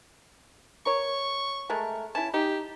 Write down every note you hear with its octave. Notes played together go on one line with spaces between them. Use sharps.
A#4 C#5 C#6
G#3 A3 A#4
C#4 E4 A5
D#4 G4